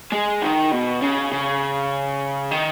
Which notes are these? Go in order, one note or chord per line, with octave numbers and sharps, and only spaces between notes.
G#3
D#3
B2
C#3
C#3
D#3